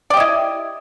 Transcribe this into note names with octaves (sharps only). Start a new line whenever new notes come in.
E4 G4 D5 D#5